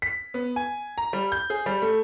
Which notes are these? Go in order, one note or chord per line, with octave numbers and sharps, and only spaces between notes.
B6
B3
G#5
A#5
G3
G6
G#4
G3
A3